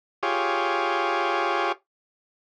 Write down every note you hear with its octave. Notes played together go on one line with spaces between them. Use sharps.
F4 G4 G#4 C#5